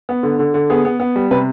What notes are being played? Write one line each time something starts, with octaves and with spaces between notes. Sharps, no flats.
B3
D3
D3
D3
B3 G#4
B3
B3
G3
C3 B4